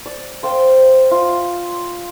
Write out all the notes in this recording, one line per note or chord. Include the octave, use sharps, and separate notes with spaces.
D5
C5 F5 G5
F4